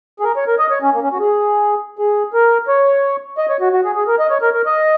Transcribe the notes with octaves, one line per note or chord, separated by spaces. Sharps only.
G#4
A#4
C#5
A#4
D#5
C#5
C#4
A#3
C#4
F#4
G#4
G#4
A#4
C#5
D#5
C#5
F#4
F#4
G#4
G#4
A#4
D#5
C#5
A#4
A#4
D#5